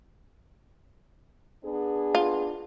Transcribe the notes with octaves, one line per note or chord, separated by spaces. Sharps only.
B3 D4 G#4
F4